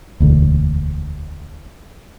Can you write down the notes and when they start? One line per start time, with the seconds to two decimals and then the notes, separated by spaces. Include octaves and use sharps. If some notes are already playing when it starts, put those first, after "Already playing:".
0.20 E1 D2